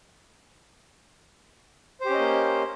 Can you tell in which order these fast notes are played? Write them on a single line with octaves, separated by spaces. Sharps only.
C5 G4 C#4 D#5 A#3